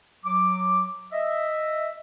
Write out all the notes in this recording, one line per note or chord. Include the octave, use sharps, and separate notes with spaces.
F#3 D6
D#5 E5